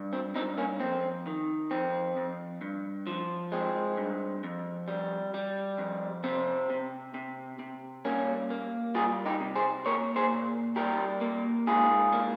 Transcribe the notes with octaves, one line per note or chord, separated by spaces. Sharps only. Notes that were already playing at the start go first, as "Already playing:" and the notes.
Already playing: G2
C4
G2 C4 D#4
A#3 C#4
F2 C4
D#3
F2 C4
F2
G2
F3
G#3 C4
G2
F2
G3
G3
F2
C3 C4
C3
C3
C3
G3 A#3 C#4
A#3
G3 F4 G#4
D#4 G4
C3
G#4 C5
A#3 A#4 C#5
G#4 C5
A#2
G3 G4 A#4
A#3
G#2 F4 G#4
A#3